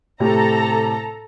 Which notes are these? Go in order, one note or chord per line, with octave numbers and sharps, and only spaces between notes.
A2 C3 G4 A4 A#5